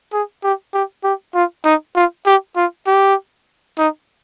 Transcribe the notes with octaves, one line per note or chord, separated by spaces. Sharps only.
G#4
G4
G4
G4
F4
D#4
F4
G4
F4
G4
D#4